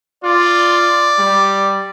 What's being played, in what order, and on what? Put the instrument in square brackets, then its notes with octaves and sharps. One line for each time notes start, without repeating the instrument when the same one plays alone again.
[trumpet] F4 [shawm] D5
[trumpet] G3